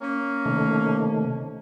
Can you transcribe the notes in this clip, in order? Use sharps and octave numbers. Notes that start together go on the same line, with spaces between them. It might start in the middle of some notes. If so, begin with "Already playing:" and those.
A#3 C#4
C3 D#3 A3